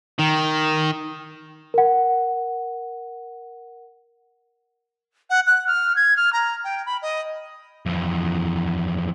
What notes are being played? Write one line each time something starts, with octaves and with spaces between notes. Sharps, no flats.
D#3
A#4 F#5
F#5
F#6
F6
G#6
F6
A#5
G5
B5
D#5
F2 E3